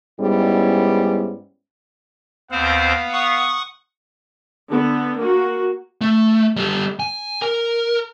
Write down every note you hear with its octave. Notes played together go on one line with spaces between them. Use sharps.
G#2 G3 B3 C#4 E4
D#2 B3 C4 C5 F5
F#5 C#6 D#6
D3 B3
A#3 F#4
A3
G3 A4
G#5
A#4